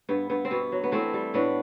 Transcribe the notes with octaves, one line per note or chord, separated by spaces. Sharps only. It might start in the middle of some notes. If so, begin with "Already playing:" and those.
G2 B3
G2 B3
C4
B2 B3
F#3
B3
E3 A3 C4
G3
A2 B3 D4